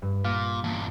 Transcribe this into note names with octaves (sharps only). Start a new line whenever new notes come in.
G2
A#2 F5
E2 A#2 A5